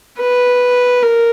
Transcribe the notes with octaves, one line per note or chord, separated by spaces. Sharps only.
B4
A#4